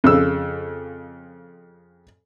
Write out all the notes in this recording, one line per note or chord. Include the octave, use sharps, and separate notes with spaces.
F2 C#3 E6